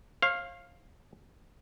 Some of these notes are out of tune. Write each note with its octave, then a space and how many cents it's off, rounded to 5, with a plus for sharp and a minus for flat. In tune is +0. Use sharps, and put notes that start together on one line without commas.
C#5 -45 F5 +0